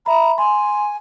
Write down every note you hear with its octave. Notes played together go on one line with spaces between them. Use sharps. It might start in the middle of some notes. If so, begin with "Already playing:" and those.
E5 A#5 B5
G#5 C6